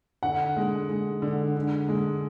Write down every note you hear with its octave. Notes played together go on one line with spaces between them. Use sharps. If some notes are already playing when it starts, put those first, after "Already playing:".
D3 F#5
G#3
G#3
D3
D3
G#3